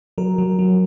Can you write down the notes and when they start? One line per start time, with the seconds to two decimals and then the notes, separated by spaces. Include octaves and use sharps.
0.18 F#3 A#4
0.38 F#3
0.59 F#3